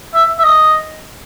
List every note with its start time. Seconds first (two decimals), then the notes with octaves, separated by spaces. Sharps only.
0.14 E5
0.39 E5
0.44 D#5